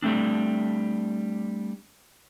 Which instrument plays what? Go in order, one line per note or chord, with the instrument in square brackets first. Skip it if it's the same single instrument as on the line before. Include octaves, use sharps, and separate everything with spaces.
[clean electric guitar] G3 A3 C4 D4